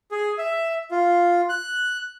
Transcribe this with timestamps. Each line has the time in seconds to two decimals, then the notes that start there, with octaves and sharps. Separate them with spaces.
0.11 G#4
0.38 E5
0.91 F4
1.49 F#6